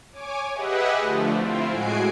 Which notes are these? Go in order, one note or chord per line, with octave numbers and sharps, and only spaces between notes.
C#5 G#5 D6
G4 G#4 B4 D#5 E5 F#5
D3 F3 A3
C4 E4 F4
A2 G#3 F#4 G#5 C7 D7